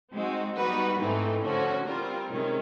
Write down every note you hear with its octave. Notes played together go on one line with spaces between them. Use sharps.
G#3 C4 D#4 F#4
G3 B3 D#4 F#4 B4
G#2 E3 A3 C4 D#4
D3 F3 A3 C#4 F#4
G3 C4 F4 A#4
C3 D#3 G#3 C#4